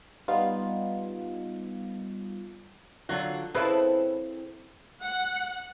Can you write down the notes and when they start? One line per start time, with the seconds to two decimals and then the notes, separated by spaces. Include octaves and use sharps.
0.28 G3 B3 D#4 F4
3.09 D3 F#3 F4 F#4
3.55 C#3 C4 E4 G#4 A4 B4 A5
5.02 F#5